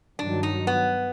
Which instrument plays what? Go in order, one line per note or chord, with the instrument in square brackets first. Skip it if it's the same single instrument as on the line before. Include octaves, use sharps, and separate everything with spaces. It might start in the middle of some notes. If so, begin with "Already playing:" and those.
[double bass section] G2 D#3 F#3 [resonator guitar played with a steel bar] D4
[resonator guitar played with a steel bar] D#4
B3